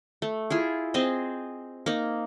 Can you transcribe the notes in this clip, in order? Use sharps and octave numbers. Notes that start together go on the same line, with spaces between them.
A3
E4 F4 G#4
C4 G#4 C5 D#5
A#3 D#4